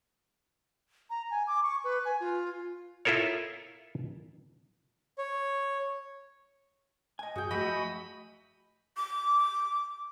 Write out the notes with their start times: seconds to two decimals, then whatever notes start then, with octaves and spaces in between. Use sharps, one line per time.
1.10 A#5
1.31 G#5
1.47 D6
1.63 C#6
1.84 B4
2.05 G#5
2.20 F4
3.05 E4 F4 A4 A#4 C#5
5.18 C#5
7.19 D#5 G#5
7.36 G2 F#4 G#4 G5
7.51 F3 A3 F#4 D#5 E5 B5
8.97 D6